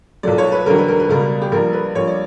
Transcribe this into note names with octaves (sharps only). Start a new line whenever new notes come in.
B1 A#2 F#3 D5
C#5
B4
E1 D2 D3 F#3 A#4
B4
A#4
B4
C#2 B2 G3 A#4
G4
A#1 A#2 G3 A#4
B4
A#1 A#2 G3 C#5
D5